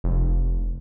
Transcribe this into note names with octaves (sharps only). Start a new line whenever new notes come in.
F1